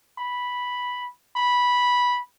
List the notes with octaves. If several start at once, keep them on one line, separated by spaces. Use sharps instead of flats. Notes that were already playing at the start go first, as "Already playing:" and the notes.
B5
B5